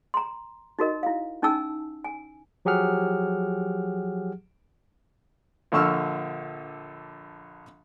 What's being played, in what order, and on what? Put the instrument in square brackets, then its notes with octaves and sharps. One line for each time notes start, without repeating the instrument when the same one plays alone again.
[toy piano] A#5 C6
D#4 F#4 A#4 D#5
E4 F5
C#4 D#4 G#5 A5 E6
G#5
[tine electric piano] F3 F#3 G4 G#4 F#5 F6
[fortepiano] A#1 D3 C#6 E6 F6